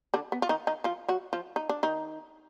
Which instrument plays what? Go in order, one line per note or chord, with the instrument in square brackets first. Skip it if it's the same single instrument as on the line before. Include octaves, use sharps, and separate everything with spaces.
[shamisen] D3 D4
B3
F4
D#3 D#4
D#3 D#4
F3 F4
F#3 F#4
F3 F4
D#4
D4
D#3 D#4